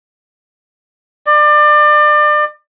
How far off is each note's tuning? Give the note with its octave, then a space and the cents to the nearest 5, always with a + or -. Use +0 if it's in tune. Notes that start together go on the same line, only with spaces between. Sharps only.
D5 +30